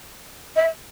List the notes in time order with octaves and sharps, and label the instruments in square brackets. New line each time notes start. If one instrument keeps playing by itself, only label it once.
[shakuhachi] E5